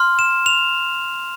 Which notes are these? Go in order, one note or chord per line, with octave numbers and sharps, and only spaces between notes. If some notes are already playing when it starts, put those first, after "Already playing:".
Already playing: C6 F6
E7
F7